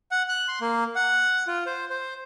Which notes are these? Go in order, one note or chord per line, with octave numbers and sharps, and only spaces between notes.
F#5
F#6
C6
A#3
F#5
F4
C5
C5